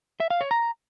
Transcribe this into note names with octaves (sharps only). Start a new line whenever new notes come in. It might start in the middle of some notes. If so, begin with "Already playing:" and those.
E5
F5
C#5
A#5